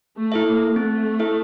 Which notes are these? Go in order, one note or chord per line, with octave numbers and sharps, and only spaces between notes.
A3
E4 A4 E5
A#3
A3 C4
E4 A4 E5